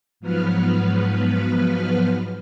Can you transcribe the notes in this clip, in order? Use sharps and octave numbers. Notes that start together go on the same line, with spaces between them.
G#2 F3 F#3 B3 B4 F6